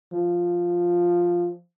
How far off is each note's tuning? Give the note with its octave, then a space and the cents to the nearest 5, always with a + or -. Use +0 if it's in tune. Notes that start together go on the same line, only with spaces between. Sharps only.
F3 +0